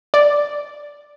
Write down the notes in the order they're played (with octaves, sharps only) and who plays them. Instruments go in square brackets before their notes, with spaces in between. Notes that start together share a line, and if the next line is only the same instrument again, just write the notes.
[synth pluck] D5